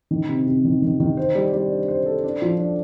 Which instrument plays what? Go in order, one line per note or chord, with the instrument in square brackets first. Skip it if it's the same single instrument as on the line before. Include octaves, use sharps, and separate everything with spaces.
[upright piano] D#3
C3
C3
D#3
D#3
D#3
C5
G3
G3
D4
C5
A4
D4
F3
D4